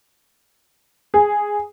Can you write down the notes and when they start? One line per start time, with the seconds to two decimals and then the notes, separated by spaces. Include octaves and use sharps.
1.14 G#4